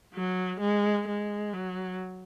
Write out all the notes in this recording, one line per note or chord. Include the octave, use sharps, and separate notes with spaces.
F#3
G#3
G#3
F#3